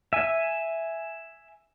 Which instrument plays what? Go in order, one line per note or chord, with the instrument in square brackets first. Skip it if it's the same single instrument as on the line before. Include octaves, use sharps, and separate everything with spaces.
[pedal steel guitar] E5 G#5